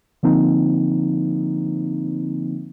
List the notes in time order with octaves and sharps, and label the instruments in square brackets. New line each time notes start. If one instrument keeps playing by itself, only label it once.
[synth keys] D3 F3 A#3 C4 D#4